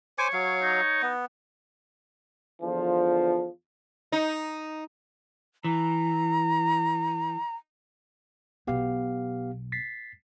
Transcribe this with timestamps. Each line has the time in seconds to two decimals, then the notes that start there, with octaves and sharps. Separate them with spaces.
0.18 C5 C#5 G#5 D6
0.33 F#3 F5
0.62 D#4
1.02 B3
2.62 E2 D3 F3
4.12 D#4
5.64 E3 A#5
8.67 B1 B2 B3 G4 F5
9.72 A6 B6 C7